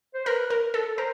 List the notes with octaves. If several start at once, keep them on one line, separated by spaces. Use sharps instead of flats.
C5
A#4 B4
A#4
A4
A#4 C5